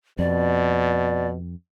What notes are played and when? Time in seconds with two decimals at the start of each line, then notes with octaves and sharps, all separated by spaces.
0.19 F2 B2 D5